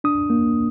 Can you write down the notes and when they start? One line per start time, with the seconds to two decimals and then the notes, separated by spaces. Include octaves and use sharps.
0.04 D4 D#6
0.30 A#3